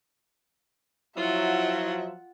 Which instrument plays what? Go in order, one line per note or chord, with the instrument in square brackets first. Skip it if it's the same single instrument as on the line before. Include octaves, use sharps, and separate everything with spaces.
[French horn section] F3 F#3 [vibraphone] E4 [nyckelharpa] F4 F#5 [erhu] E5